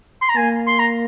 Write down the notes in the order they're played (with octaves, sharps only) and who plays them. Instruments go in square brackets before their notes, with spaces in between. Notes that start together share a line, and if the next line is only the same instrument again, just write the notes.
[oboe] C6
A#5
[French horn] A#3 [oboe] G#5
[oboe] C6
A#5